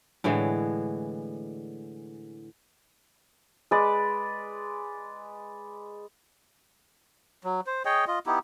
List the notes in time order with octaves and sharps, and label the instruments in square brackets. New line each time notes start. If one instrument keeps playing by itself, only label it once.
[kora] A2 D3 E3 G#3
[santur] G#3 B4 D5
[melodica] F#3
C5
G#4 C#5 D#5 G5
F4 D#5
B3 D#4 E4 G4